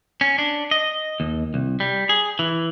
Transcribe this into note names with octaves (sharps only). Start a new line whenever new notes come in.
C#4
D4
D#5
D#2
C2
G3
G#4
E3